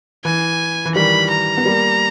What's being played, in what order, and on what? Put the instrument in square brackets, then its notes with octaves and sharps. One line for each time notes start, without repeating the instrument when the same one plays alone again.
[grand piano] E3 [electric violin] G#5
[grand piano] E3
[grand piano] D#3 G3 [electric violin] B5
[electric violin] A#5
[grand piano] B3
G3 A#3